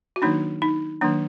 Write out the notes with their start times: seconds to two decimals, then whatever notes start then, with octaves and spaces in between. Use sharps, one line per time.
0.16 F#4
0.22 D#3 F#3 A#3 D4 D#4
0.62 D#4
1.01 D#3 F#3 A#3 D4